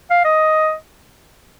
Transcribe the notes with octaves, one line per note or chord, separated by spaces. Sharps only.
F5
D#5